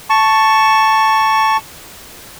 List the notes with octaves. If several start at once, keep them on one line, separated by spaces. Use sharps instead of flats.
A5 C#6